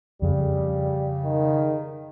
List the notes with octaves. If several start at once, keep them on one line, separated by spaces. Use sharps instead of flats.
F2 C#3 G3
D#3